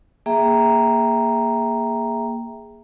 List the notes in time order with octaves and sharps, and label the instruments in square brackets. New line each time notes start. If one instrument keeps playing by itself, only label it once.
[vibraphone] A#3 G#4 E5 G5 A#5